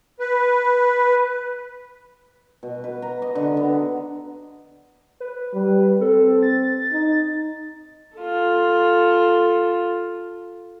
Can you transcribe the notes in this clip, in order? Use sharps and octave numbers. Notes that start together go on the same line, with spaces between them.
B4
B2
B4
A#5
D#5
D3
B3
B4
G3
C4 A4
A6
D#4
F4 A4